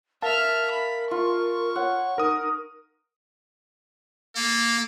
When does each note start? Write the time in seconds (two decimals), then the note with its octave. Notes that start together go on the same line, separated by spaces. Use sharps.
0.22 A#4 E5 F5 A5 F6
0.71 B5
1.11 F4 C#6
1.76 C#5 F#5
2.18 D#4 A#4 D#6
4.36 A#3 A4